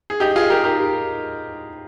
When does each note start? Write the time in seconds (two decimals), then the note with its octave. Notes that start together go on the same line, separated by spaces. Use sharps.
0.10 G#4
0.20 D#4 G4
0.36 F4 G#4
0.50 G4 A#4
0.64 G4 A#4